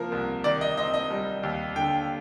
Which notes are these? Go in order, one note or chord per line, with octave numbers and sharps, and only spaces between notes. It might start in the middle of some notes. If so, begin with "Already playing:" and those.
Already playing: C3 F3 A#3 A#4
C2
D#3 D5
D#5
C4 D#5
D#5
G3
D#2
D3 G5